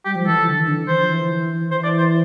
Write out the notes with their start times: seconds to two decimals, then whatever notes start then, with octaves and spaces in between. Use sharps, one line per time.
0.05 G3 G4
0.15 F3
0.26 E3 A4
0.46 D3
0.59 E3
0.68 D3
0.88 E3 C5
0.99 F3
1.10 E3
1.71 E3 C5
1.84 D5
1.98 C5